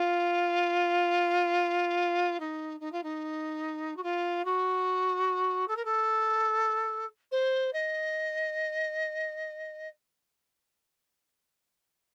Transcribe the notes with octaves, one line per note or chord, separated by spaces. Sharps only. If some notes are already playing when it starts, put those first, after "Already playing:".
Already playing: F4
D#4
D#4
F4
D#4
F#4
F4
F#4
A4
A#4
A4
C5
D#5